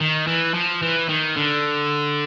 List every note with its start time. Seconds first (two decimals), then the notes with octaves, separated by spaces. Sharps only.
0.01 D#3
0.27 E3
0.54 F3
0.82 E3
1.09 D#3
1.37 D3